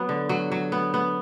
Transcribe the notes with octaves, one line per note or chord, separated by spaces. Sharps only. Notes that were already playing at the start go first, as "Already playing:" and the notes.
Already playing: F#3 B3
D3
F#3
F#3
B3
B3